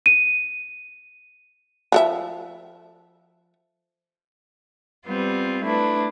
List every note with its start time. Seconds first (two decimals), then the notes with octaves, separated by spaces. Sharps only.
0.06 D#7
1.92 F3 A4 E5
5.05 G3 B3 C4 F4
5.63 A3 D4 E4 B4